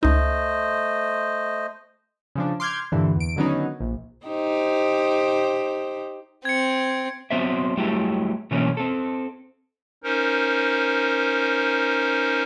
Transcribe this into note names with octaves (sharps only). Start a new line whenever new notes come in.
C#2 A3 D#4 C5 D#5
C#3 F3 D4
C6 D6 F6 G6 G#6
G2 A#2 D3 E3
E2 D7
D3 D#3 F#3 B3 C#4 D#4
A#1
D#4 G4 C5
C4 G#6 C#7
F#3 B3 C4 C5 D5 E5
F#3 G3 A3 E4 G4 G#4
B2 E3 F#3 A#3 C4 C#4
C4 A4
C#4 D#4 A#4 C5